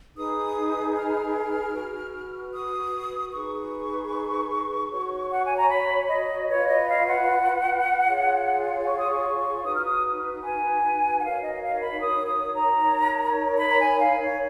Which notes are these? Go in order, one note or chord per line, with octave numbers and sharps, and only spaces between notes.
D#4 G#4 B4 D#6
F6
F#4 B4
D#6
D#4 G#4 B4 C#6
F#4 C#5
F#5
G#5
A#5
B5
D#5
F4 B4 C#5
D#5
F5
F#5
F4 G#4 C#5
C#6
D#6
C#6
D#4 F#4 B4 D#6
F6
D#6
G#5
F#5
D#4 F#4 A#4 C#5 F5
D#5
F5
B5
D#6
D#6
A#5
D#4 A#4 C#5
B5
A#5
G#5
F5
C#5